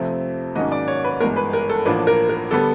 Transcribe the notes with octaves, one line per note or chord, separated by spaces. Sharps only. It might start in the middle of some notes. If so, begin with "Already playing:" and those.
Already playing: F2 C3 F3 A3 C4
G#2 D#3 F#3 A#3 C#4 D#5
D5
C#5
B4
G1 G2 E3 G#3 A#4
B4
A#4
A4
A1 A2 F3 A#3 D4 B4
A#4
A#4
D3 G3 B3 A4